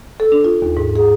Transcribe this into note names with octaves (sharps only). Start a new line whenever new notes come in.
A4
D4
F4
D#2
G#2
G#4